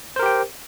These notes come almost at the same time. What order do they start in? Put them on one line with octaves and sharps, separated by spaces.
C5 A#4 G4 G5